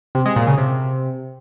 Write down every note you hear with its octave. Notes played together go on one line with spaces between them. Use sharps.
C3
G#3
A#2
C#3
C3